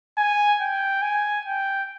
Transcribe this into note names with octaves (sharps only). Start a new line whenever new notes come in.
G#5
G5
G#5
G5